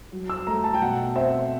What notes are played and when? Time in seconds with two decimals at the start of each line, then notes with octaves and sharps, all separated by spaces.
0.12 F#3
0.30 E6
0.47 A3 A#5
0.64 A5
0.74 G5
0.82 B2 F#5
1.16 C4 E5